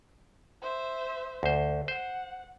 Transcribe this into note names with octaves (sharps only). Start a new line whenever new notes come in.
C5 E5
D2 C5
C5 F#5